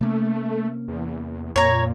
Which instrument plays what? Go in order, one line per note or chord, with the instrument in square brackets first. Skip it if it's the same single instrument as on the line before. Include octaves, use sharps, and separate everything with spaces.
[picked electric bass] C3 A#3 C#4 [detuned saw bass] A3
[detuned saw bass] E2
[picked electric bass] F2 [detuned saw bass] A#2 [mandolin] C#5 A#5